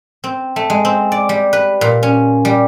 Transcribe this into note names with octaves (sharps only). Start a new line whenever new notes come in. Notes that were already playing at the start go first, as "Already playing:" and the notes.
C4
A3
G#3
C4
D5
G3
B4
A#2
C#4
G3